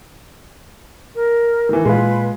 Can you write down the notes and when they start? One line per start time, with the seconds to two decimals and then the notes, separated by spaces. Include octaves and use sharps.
1.15 A#4
1.69 D#3 E3
1.85 A#2 G#3 F4 B4